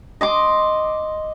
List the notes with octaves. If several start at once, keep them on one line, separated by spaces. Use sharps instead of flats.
D#5 C6 D6